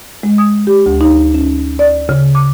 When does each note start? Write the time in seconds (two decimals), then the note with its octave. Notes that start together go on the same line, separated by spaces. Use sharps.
0.23 G#3
0.38 D#6
0.67 G4
0.86 D2
1.01 D#4
1.34 C#4
1.79 D5
2.09 C#3
2.35 D6